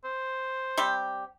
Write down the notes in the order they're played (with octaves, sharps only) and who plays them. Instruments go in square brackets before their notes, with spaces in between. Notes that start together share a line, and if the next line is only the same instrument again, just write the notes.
[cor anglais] C5
[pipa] G3 C4 G4